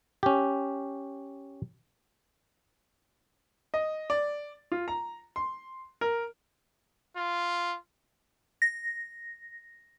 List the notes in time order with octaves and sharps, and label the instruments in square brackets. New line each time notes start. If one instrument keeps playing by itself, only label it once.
[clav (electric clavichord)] C#4 G4
[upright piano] D#5
D5
F4
A#5
C6
A#4
[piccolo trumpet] F4
[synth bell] A#6